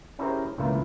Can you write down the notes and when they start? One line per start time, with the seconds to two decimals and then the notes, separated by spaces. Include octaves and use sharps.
0.19 C#4 E4 G4 G#4 A#4 C5
0.58 C#2 A2 E3 A#3 E4 F4